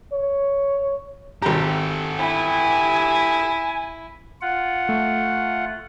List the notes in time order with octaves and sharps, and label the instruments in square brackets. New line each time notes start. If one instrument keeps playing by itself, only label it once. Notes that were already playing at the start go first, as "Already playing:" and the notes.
[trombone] C#5
[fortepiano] G#1 A#5 [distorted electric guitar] G4 A4
[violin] E4 [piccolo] G#5
[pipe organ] F4 F#5
[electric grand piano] A3